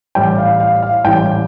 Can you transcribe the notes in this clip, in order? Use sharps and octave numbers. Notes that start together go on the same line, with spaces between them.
A1 A2 G3 G5
F5
F5
F5
A1 A2 G3 G5